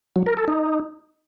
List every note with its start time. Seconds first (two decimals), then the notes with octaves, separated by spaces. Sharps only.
0.16 F#3
0.26 A#4
0.37 A4
0.48 D#4